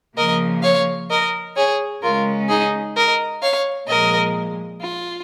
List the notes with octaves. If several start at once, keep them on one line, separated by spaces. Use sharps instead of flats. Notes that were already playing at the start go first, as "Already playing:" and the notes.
C#3 F3 A#3 A#4 D#5
C#5 F5
A#4 D#5
G#4 C#5
C#3 G#3 C#4 F4 A#4
D#4 G#4
A#4 D#5
C#5 F5
A#2 F3 G#3 A#4 D#5
F4